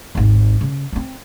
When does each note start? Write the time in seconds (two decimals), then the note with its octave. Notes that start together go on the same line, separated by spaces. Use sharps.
0.15 G#1 D#2
0.61 C#3
0.93 A#3 C4